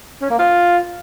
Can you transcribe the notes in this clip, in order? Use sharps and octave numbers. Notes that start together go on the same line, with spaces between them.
C#4
A#3
F4